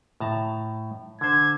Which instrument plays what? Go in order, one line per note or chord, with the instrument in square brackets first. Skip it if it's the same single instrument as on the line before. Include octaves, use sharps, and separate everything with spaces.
[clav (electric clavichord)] A2 A5 A#5
[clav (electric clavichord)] D3 C5 [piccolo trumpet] G#6